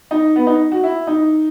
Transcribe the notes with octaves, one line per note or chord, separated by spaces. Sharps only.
D#4
B3
D#4
F#4
E4
D#4